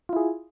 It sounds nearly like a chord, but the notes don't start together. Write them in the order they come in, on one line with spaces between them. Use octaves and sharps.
F4 E4 G#4